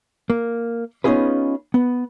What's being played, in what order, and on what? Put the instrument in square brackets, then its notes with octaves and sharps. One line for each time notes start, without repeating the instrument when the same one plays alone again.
[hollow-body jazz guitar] A#3
B3 C#4 D#4 F4 G#4 B4
B3